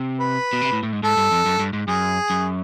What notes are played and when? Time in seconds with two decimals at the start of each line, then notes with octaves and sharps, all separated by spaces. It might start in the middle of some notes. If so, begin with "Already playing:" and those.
Already playing: C3
0.20 B4
0.53 B2
0.61 C3
0.73 A2
0.83 A2
0.93 G#2
1.03 G#2 A4
1.17 G2
1.31 F2
1.46 F#2
1.59 G2
1.73 G#2
1.88 F#2 G#4
2.30 F#2